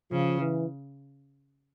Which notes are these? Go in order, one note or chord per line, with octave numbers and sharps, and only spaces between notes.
C#3 F3
E3